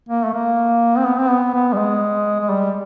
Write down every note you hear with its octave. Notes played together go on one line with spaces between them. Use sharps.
A#3
A3
A#3
C4
B3
C4
B3
B3
G3
G#3
G#3
G3